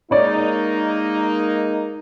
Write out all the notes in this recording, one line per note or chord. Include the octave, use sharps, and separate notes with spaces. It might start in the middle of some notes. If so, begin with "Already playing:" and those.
G#3 A#3 D#4 C#5 D5